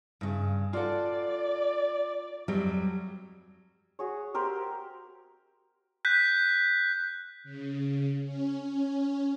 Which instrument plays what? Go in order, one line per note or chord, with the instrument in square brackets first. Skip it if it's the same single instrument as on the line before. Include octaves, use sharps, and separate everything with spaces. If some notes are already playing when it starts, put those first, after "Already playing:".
[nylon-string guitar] G2 C#3
[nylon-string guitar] F4 F#4 A4 [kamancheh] D5
[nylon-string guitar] F2 F#3 G3
[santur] F#4 G#4 C#5
G4 A#4 C5 E5
[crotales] F#6 G6 B6
[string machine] C#3
C#4
C#4